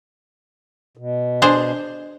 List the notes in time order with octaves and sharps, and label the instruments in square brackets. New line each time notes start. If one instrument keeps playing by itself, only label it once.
[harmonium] B2
[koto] D4 G#4 C5